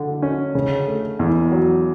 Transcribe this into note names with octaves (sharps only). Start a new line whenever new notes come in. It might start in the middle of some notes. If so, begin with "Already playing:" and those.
Already playing: D3
C#4
C#3
A3
E2
F#3